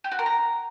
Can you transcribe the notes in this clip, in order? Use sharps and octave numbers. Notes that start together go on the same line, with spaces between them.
G4
F#4
A#4
A#5